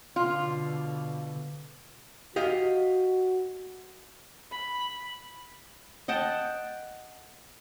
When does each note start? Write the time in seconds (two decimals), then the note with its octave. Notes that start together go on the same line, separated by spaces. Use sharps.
0.16 B2 D3 F4
2.36 F#4 G4 D#5 F5
4.51 B5
6.08 D#5 F#5 G5 A5